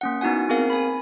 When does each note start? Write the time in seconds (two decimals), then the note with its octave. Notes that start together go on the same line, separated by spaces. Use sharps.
0.01 A#3 C#4 F#5
0.21 B3 D#4 E4 F#4 F#5 G#5
0.49 C4 G#4 A#4 F5
0.70 G#5 B5